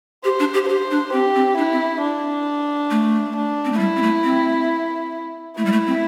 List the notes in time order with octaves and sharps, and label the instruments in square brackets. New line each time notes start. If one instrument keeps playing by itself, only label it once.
[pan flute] G4 [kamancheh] C5
[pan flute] D4
G4
[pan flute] G4 [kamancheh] C5
[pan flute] D4
[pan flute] C4 [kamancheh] G4
[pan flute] C4
[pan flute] D4 [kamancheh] E4
[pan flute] C4
[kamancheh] D4
[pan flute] A3
[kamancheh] D4
[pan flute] C4
A3
[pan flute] G3 [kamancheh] E4
[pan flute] C4
A3
C4
[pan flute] A3 [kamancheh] E4
[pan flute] G3
A3
C4